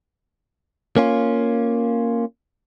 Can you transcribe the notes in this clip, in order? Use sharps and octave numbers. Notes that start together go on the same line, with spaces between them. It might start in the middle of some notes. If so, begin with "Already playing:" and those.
A#3 C#4 F4